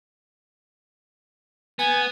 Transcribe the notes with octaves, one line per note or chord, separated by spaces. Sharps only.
B3 G#5